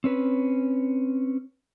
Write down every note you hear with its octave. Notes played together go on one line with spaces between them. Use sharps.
C4 C#4 B4